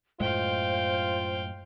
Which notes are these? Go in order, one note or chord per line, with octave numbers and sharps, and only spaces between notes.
F#2 A2 G#3 F4 C5 F5 G5